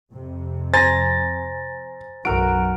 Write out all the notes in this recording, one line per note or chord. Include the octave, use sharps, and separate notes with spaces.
F2 C3
C5 G#5 A#5 A6 A#6
B1 F#2 F#3 F#4 A#4 D7